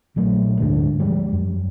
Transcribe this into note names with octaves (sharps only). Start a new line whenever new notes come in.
A#1 F#3 A3
D2 G#2 D3 G#3
F3 G3 G#3
F#2